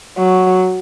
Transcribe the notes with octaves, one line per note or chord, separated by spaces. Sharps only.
F#3